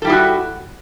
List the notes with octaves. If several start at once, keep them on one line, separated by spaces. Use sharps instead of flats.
G3 E4 F#4 G#4 A4